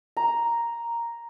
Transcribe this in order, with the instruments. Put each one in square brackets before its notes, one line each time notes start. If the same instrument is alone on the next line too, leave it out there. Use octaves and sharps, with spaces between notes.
[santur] A#5